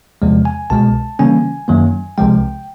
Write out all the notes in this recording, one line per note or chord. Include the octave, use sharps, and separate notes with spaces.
E2 C3 F3 G#3
G#5
C2 B2 G#3 A5
C#3 E3 G3 A#3 C#4 G#5
F#2 D#3 F#3 A#3
C2 C3 F3 G#3 G5